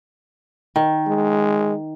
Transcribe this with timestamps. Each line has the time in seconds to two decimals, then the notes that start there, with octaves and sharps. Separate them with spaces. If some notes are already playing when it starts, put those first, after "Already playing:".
0.76 D#3
1.07 G#3